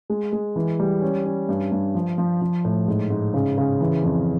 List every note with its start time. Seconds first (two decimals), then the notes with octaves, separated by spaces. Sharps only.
0.10 G#3
0.32 G#3
0.56 E3
0.80 G3
1.02 C#4
1.25 C#4
1.49 G2
1.72 G2
1.95 F3
2.18 F3
2.41 F3
2.65 A2
2.88 G#2
3.10 G#2
3.34 C#3
3.58 C#3
3.81 E3
4.04 F2